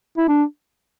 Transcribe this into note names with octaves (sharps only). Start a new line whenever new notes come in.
E4
D4